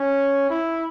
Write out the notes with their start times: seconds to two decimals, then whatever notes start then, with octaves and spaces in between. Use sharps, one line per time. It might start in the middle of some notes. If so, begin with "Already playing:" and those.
Already playing: C#4
0.50 E4